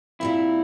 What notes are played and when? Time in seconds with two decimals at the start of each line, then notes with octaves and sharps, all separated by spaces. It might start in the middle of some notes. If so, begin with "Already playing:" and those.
0.20 A#2 G3 C4 E4